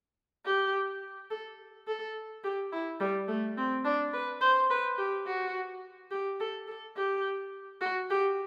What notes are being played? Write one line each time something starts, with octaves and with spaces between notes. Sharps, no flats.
G4
A4
A4
G4
E4
G3
A3
C4
D4
B4
C5
B4
G4
F#4
G4
A4
A4
G4
F#4
G4